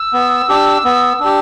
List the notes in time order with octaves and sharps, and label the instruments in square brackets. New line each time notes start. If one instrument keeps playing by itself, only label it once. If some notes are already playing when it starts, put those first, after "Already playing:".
Already playing: [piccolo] E6
[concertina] B3
D4 G4
B3
D4 G4